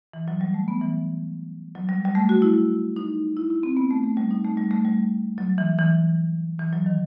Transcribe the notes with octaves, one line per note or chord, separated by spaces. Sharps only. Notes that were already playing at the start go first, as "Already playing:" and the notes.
E3
F#3
G3
A3
B3
E3
F#3
G3
G3
A3
F#4
E4
D#4
E4
E4
C4
B3
A3
A3
G3
D#4
A3
G3
A3
G3
F#3
E3
E3
E3
F#3
D#3